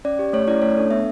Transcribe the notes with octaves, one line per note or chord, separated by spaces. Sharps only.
C#4 D5
G4
A3 C#5
C#4 E4 D5
A3 C#5
D4 A4
B3 E5